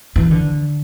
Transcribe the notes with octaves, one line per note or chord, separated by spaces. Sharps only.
E3
D3